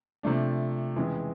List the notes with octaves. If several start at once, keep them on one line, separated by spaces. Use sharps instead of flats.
C3 F3 A3 D4
F2 C#3 E3 G#3